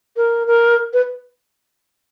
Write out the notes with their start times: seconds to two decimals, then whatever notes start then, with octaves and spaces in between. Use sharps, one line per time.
0.17 A#4
0.48 A#4
0.93 B4